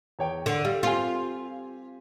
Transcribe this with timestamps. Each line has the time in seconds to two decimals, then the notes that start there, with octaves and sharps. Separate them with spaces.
0.19 E2 C#5 G5
0.46 D3
0.65 G3 F5
0.83 C4 F4 G4 G#5